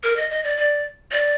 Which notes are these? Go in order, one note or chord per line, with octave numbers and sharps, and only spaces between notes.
A#4
D#5
D#5
D5
D5
D5